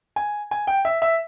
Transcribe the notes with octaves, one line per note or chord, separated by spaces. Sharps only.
G#5
G#5
G5
E5
E5